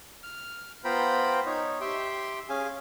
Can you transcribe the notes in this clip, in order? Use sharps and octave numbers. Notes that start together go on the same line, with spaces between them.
F6
B3 F4 C5 G5 A#5 B5
D#4 C#5
G4 E5 G5 C6
C#4 G#4 F5 G#5